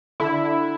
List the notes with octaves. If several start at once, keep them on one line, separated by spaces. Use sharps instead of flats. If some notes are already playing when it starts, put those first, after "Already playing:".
D3 E4